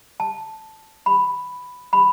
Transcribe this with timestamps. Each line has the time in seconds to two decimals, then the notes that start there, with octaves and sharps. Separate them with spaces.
0.20 A5
1.06 B5
1.93 B5